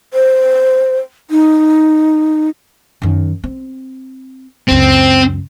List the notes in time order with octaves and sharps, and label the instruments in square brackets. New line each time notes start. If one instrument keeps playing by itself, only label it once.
[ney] C5
D#4
[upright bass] F#2 D#3
C4
[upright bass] C#2 F#2 [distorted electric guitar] C4